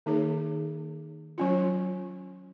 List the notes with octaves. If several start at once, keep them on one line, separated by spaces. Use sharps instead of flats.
D#3 A#3 D#4 G#4 C#5
F#3 C#4 F4